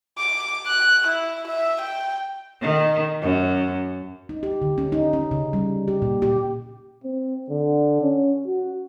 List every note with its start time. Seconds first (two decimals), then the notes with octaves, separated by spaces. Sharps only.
0.18 D6
0.67 F#6
1.07 E4
1.47 E5
1.81 G5
2.61 D#3
3.21 F#2
4.29 D#4
4.43 G4
4.62 D3
4.78 C#4
4.92 D#4
5.13 C#4
5.31 C#3
5.53 G3
5.88 G4
6.02 A#2
6.22 G4
7.04 C4
7.49 D3
8.02 C#4
8.47 F#4